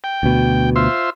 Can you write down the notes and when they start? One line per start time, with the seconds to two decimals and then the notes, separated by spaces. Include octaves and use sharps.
0.04 G5
0.23 D2 B2
0.76 F4 C5 E5